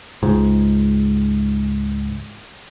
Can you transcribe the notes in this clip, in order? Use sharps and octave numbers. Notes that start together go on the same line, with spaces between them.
C#2 G#2